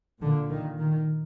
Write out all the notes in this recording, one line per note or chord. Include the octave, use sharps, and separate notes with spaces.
A#2 D3
D#3
D#3